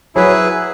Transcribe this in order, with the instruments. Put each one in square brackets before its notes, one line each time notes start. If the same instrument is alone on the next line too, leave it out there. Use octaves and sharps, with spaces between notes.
[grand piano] F#3 [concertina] E4 G#4 B4